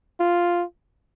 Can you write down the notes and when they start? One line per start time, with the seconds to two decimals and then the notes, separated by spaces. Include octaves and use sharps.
0.20 F4